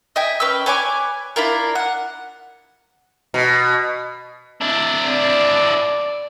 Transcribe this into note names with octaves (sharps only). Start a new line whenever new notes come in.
D#5 E5 G5 G#5
C#4 B4 G5 E6
B4 C#5 G#5 D6
D4 E4 F4 A#4
F#5
B2
D4 E4
D5